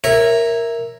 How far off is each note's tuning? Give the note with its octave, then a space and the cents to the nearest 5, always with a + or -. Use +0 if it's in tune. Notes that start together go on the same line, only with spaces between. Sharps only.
A#4 +0 C#5 -20 E5 +0